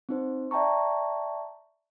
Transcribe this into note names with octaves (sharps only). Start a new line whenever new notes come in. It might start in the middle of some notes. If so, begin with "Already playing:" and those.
C4 D#4 C5
D5 E5 G5 A5 A#5 C#6